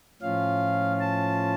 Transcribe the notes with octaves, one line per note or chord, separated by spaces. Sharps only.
A2 F3 C#4 F4 F5
A5